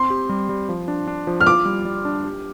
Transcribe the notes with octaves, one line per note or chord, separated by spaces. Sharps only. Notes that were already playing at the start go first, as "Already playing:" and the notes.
Already playing: C4 C6
G4
G3
G3
F3
D4
D4
F3
F6
F4 D6
G3
G3
D4
G4